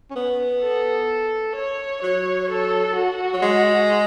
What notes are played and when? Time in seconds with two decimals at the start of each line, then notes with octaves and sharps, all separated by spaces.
0.10 C#4
0.15 B3
0.62 A4
1.56 C#5
2.02 F#3 C#5
2.50 A4
2.96 F#4
3.34 F#3
3.42 G#3